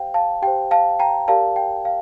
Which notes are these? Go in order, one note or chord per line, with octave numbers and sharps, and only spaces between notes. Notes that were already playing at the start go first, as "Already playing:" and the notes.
Already playing: G4 C5 F5 G5
F5 A5
G4 C5 G5
F5 A5
G5 A#5
G4 A#4 D5 F5 A5
G5
F5